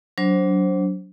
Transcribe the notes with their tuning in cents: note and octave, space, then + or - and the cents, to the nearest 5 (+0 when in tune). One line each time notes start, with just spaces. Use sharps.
F#3 +10 D4 -25 C5 +15